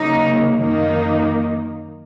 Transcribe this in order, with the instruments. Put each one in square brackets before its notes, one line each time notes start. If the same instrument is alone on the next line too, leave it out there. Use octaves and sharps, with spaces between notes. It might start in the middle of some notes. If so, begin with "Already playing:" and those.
Already playing: [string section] C#3 F#3 A#3 [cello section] D#4
[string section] F#2 D#3 A#3 D#4